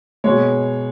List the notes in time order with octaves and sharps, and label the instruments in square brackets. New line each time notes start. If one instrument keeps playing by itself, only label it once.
[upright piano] B2 G#3 C#5